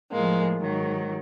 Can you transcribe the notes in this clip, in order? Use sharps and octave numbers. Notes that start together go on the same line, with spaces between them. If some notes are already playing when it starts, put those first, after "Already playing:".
A2 F3 G#3 A#3
G#2 D#3 F#3